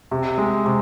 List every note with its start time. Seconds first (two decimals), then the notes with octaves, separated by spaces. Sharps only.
0.11 C3
0.38 G#3
0.66 C3